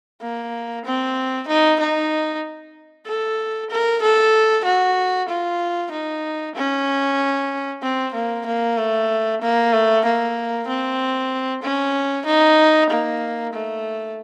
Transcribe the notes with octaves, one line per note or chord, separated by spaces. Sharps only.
A#3
C4
D#4
D#4
A4
A#4
A4
F#4
F4
D#4
C#4
C4
A#3
A#3
A3
A#3
A3
A#3
C4
C#4
D#4
A#3
A3